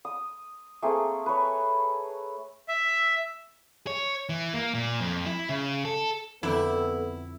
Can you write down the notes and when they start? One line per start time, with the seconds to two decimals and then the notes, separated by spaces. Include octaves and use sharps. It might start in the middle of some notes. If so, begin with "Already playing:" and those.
0.05 D#6
0.82 A3 A#3 C4 G#4
1.26 B4 C#5
2.68 E5
3.87 C#5
4.29 E3
4.53 A#3
4.75 A#2
5.00 F2
5.26 E4
5.49 C#3
5.85 A4
6.43 F2 D3 B3 E4 A4 G5